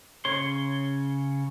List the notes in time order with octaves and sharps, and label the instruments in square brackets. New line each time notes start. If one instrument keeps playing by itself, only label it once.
[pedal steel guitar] C#3 C#5 C6